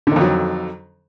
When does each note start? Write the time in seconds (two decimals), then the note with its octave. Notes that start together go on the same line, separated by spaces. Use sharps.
0.07 D3
0.12 D#3
0.16 F2
0.21 F#3